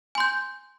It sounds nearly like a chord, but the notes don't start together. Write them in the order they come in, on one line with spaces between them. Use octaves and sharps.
G#5 C6 G6